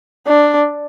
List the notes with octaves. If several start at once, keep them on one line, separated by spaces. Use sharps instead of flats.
D4